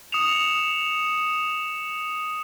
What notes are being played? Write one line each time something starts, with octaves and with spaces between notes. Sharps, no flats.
D#6 C#7 E7 F7